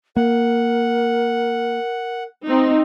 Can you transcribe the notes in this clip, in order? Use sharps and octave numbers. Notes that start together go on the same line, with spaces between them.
A#3 A#4 F#5
C4 D#4